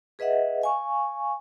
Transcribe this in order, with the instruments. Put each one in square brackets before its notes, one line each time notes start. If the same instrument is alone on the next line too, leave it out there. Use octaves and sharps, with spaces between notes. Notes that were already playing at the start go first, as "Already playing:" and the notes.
[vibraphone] G#4 B4 D#5 E5 F#5
F5 G#5 C#6